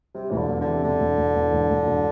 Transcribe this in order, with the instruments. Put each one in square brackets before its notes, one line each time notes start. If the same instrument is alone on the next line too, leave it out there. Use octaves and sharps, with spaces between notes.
[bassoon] C3 [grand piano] G3
[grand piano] E1 [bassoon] E3
[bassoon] D3
[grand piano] E2
[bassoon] D3
[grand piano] C3
[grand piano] E1 [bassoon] D3
[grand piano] E1
E1
E2
E1
E1
E1